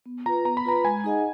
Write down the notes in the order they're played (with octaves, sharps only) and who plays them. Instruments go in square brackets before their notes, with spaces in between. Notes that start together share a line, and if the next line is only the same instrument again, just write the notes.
[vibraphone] B3
[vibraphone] F4 B4 [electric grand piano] A#5
[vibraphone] B3 [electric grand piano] A#5
[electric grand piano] B5
[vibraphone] F4 B4 [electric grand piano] A#5
[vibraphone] G#3 [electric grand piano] G#5
[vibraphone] D#4 G#4 D#5 F#5